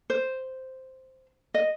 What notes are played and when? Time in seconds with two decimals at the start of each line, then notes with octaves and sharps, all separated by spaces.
0.10 C5
1.54 D#5